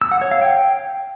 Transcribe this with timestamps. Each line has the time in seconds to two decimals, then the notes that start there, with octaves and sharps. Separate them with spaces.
0.01 E6
0.11 F#5
0.21 C#5
0.31 F5
0.41 G5